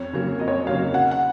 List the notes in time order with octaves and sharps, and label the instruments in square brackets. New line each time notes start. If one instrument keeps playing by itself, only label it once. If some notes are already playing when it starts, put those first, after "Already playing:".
Already playing: [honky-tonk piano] F2 [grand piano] C#5
[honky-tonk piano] C#3 F#3 A#3
[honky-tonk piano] F2 [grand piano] D#5
[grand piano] C#5
D#5
[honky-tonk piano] C#3 F#3 A#3 [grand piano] F5
[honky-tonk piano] C#3 [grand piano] F#5
[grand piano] F#5